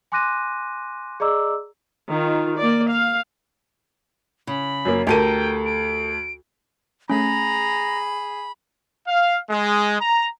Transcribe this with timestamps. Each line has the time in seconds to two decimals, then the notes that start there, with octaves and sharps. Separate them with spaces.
0.12 G#5 C6 D6 F#6 A#6 D#7
1.20 G#4 D5 D#5 A#5 D6 E6
2.10 D#3 F4
2.58 A#3 D5
2.88 F5
4.47 C#3 B5
4.85 F#2 A#3
5.07 D2 G4 A4 A#4 G5 A5 D#7
5.65 D7
7.10 A3 C#4 G#4 A#5 B5
9.08 F5
9.48 G#3
9.99 A#5